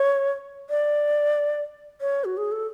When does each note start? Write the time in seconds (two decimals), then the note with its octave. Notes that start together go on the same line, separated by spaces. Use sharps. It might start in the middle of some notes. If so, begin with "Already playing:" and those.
Already playing: C#5
0.70 D5
2.01 C#5
2.25 F#4
2.37 G#4
2.52 A4